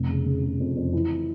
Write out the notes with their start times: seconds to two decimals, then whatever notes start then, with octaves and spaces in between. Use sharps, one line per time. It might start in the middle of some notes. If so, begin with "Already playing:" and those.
Already playing: F1
0.09 C#3
0.26 C#3
0.42 C#3
0.60 F2
0.77 F2
0.93 E3